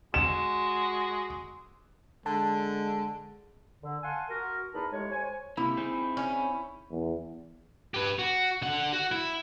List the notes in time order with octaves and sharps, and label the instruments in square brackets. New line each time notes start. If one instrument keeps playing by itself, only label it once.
[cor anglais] G#3 [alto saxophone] F#4 [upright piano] E7
[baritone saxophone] D3 [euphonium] G#3 [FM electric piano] A5
[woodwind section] D3
F5 F#5 G#5 A5 C6
F#4 A#4
E2 D#4 A#4 A5 B5
A2 G#3 G4 C#5
C5 C#5 G#5
[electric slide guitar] C3 A#3 [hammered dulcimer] E4
[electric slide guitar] C4 D#4 G#4
[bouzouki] C#4
[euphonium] E2
[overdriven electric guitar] G4 B4
F#4
D3 F#5
F#4
E4